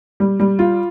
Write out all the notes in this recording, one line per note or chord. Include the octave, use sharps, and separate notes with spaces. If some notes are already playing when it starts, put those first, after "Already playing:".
G3
G3
F4